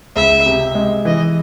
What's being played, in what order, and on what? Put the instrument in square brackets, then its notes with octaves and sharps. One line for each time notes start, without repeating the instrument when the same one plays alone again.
[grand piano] C#2 [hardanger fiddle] E5
[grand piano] C3
G#3
[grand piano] E3 [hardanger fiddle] D#5